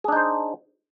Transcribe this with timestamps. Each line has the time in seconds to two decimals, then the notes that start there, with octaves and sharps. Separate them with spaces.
0.04 G#4
0.08 D4
0.12 D#4
0.16 C5